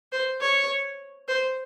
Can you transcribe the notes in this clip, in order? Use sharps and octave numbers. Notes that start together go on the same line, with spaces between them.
C5
C#5
C5